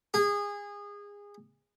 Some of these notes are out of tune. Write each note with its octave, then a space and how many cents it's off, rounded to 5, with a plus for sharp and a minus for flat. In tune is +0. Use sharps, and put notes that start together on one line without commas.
G#4 -25